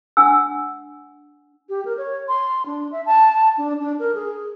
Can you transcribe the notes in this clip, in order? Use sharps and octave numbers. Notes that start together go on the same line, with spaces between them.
D4 F#5 G#5 E6
G4
A#4
C#5
C6
D4
E5
A5
D4
D4
A#4
G#4